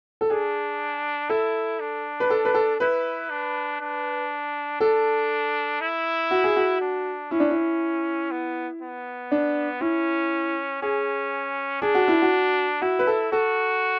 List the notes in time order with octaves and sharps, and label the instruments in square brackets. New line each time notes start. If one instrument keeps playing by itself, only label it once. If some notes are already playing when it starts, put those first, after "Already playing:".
[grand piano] A4
[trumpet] D4 [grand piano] G#4
[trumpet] E4 [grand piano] A4
[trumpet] D4
[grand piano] B4
A4
B4
A4
[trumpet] E4 [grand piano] B4
[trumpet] D4
D4
[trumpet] D4 [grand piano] A4
[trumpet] E4
[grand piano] F#4
G#4
F#4
[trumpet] D4
[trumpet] C#4 [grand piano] E4
[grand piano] D4
E4
[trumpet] B3
B3
[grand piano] D4
[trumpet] C#4 [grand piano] E4
[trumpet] C#4 [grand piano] G#4
[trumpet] D4 [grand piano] G#4
[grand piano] F#4
E4
F#4
[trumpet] E4 [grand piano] F#4
[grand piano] B4
A4
[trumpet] F#4 [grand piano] A4